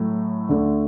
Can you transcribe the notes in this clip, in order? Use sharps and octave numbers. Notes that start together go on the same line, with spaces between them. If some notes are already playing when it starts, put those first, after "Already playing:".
Already playing: A2 F#3 A3
D2 D3 A3